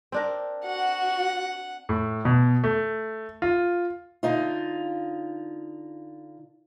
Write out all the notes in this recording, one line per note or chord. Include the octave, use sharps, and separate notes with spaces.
C4 D4 A#4
F#4 F#5
A2
B2
A3
F4
D3 D#4 F4